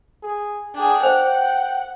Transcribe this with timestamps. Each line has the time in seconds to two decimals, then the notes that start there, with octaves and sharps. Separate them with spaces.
0.23 G#4
0.75 D4 G#4 G5
1.03 C5 F#5